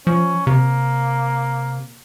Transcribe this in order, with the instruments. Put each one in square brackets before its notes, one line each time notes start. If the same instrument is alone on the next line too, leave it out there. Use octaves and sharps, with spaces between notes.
[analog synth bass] F3 [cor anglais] C#4
[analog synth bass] C3 [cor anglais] A#3